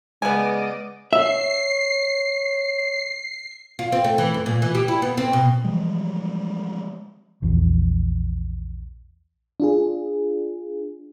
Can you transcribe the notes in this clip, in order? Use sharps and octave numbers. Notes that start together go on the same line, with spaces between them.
C#3 G#3 B3 B4 D5 D#5 G#5
C#5 E5 C7
F4
C4
A3
E3
F#2
A#2
E3
G4
E4
B3
C4
B2
E3 F3 G3 G#3
A#1 E2 F3
D4 F4 G#4